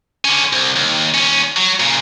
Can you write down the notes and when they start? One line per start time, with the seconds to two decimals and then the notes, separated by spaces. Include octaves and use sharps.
0.25 D3 C#4
0.53 C2
0.76 D#2
1.14 D#2 C#4
1.57 F#3
1.80 A#2 C#3